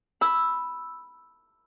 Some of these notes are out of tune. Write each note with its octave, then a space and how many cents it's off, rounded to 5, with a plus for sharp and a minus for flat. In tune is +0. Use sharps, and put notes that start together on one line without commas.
B5 +0 E6 +0